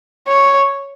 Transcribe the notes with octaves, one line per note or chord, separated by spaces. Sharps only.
C#5